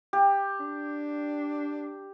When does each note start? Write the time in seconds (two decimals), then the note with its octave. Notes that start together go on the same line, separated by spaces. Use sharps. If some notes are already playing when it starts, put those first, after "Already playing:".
0.13 G4
0.60 D4